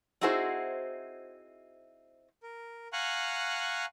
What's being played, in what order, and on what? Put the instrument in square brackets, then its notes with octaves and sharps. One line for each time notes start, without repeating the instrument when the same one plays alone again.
[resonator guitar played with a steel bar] C4 D#4 E4 F#4 G#4 C5
[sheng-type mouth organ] A#4
F5 F#5 G#5 A#5 C#6 F#6